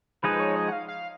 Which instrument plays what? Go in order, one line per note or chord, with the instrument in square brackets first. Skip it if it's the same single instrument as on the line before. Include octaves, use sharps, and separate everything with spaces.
[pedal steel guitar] F3 G#3 D#4 G#4 [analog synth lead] B4
[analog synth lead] C#5
D#5
F#5
F5
F5